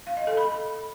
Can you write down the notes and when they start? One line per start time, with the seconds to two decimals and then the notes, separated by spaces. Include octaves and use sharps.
0.07 F5
0.17 D#5
0.27 A4
0.37 B5